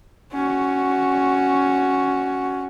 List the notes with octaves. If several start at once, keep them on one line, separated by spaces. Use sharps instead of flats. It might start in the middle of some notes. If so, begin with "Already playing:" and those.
C#4 F#4